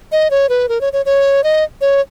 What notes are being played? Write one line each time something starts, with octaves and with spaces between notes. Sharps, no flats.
D#5
C#5
B4
A#4
C#5
C#5
C#5
D#5
C#5